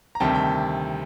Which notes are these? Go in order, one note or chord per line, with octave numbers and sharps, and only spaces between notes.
A#5
D2 C3 D#3 G3 G5 A5
G5 A5